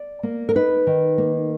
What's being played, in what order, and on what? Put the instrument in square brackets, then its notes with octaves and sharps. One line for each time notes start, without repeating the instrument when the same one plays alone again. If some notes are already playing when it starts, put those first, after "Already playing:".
Already playing: [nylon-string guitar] D5
A#3
A#4
D#4 B4
D#3
A#3